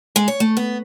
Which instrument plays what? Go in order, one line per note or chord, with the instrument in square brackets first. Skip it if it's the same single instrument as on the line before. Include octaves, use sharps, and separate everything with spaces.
[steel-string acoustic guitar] G#3
C#5
A3
B3